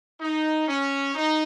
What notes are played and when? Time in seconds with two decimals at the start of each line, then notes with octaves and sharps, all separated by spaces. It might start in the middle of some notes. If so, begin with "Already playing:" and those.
0.21 D#4
0.68 C#4
1.15 D#4